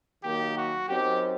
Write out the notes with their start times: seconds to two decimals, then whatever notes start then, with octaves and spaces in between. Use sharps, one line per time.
0.24 D#3 F#3 A#3 D#4 G4
0.56 F#4
0.88 F#2 F#3 C4 D#4 G4